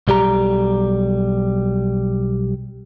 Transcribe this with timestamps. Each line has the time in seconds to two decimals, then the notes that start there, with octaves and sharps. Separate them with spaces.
0.08 B1 G3 G4 A#5